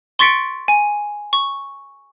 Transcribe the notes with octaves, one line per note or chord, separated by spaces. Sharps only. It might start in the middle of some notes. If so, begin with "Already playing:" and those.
C6 C#6 A6 B6 C#7 D7
G#5
C#6